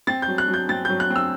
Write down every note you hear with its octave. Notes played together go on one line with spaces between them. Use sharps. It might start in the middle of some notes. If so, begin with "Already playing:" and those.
C4 A6
G6
F#3
F#6
F#3
G6
C4 A6
F#3 G6
F#6
C4
E6